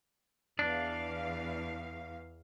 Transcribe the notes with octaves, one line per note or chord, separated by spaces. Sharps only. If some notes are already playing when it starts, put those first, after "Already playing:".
E2 D4 F5